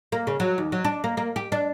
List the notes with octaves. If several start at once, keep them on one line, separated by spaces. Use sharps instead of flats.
A#3
C#3
F#3
D#2
F#3
D4
A#3
A#3
G4
D4